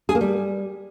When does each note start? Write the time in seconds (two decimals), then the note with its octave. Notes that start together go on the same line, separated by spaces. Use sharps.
0.09 G#4
0.15 A#3
0.21 G3